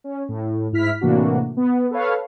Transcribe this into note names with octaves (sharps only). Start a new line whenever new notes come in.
C#4
A2
G#2 E4 F6 B6
A2 C3 E3 A#3 D4 F#4
B3
A4 B4 C#5 F5